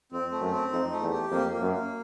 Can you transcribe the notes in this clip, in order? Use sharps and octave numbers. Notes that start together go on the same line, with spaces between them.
F2 C4
A3
F#2
C4
F2 D#4
A3
E2
G4
F2 A#3
A#3
F#2
A#3